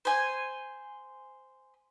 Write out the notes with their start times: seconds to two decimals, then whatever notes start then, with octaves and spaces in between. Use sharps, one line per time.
0.05 C5 G#5